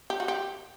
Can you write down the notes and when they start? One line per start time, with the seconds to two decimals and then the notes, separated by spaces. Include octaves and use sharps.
0.10 G4
0.20 F#4
0.28 G4